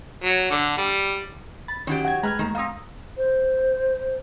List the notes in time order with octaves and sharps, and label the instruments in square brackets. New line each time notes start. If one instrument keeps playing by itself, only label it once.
[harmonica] F#3
D3
G3
[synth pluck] B5 A6
[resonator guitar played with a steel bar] D#3 F#3 G4 [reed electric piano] C#4
[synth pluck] F#5 G5 G#6
[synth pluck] G#3 [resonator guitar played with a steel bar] B4 [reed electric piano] A#5 F6 G#6
[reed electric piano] D#2 A3 [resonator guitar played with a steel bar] D#3 A#5
[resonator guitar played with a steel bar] B3 C4 [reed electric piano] F5 A#5 D#6
[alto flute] C5